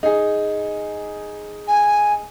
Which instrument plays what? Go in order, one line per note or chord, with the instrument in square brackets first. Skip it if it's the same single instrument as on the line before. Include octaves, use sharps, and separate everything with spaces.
[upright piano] D#4 G#4
[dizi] G#5